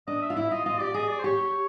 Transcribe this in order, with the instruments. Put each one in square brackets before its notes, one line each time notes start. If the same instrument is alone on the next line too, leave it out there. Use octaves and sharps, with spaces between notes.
[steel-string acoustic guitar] D4 [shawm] D#5
[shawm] E5
[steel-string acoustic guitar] F4
[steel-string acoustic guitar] E4 [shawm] E5
[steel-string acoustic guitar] F4 [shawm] D#5
[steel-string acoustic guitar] F4 [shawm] D#5
[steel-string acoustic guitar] G4 [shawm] D5
[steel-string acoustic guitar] G#4 [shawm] D#5
[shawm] D5
C5
[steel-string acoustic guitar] G4 [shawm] C#5